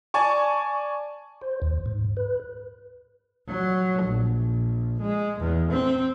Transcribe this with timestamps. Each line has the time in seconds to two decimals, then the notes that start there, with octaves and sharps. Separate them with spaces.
0.14 D5 G#5 A5 C#6
1.42 C5
1.62 D#2
1.86 G#2
2.17 B4
3.48 F#3
4.03 A#1
5.00 G#3
5.39 E2
5.70 C4